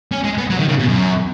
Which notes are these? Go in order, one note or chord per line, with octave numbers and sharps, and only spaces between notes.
C#4
G#3
B3
F#3
D#3
C#3
B2
F#2